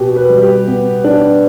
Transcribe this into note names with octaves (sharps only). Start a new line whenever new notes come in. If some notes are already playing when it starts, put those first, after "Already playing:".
Already playing: B2 G4
B4
G3
G4
B3
D4